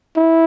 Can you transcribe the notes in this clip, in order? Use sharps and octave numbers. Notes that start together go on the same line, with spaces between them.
E4